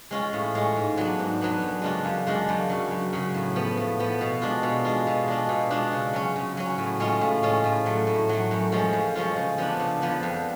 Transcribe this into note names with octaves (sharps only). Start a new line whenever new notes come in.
G#3 C#4 F4
A2
G#3 C#4 F4
G#2
F#3 B3 D4
G#2
F#3 B3 D4
F#2
C#3 G#3 D4 F4
F#2
C#3 G#3 D4 F4
F#2
C#3 F#3
F#2
C#3 F#3
A2
F3 B3
A2
F3 B3
B2
G#3 D4 F4
B2
G#3 D4 F4
B2
G#3 D4 F4
B2
G#3 D4 F4
C#3
F#3 C#4
C#3
F#3 C#4
A2
G#3 C#4 F4
A2
G#3 C#4 F4
A2
F#3 A3
A2
F#3 A3
F#2
F3 G#3 C#4 F4
F#2
F3 G#3 C#4 F4
C#3
F3 B3 D4
C#3
F3 B3 D4
F2